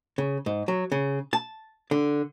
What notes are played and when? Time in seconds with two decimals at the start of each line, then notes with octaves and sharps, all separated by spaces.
0.18 C#3
0.46 G#2
0.68 F#3
0.92 C#3
1.33 A5
1.91 D3